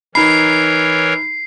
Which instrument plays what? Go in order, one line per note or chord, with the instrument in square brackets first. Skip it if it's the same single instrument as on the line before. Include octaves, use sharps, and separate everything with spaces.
[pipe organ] E3 A#4 C#5 [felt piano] D#4 B5 [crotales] C7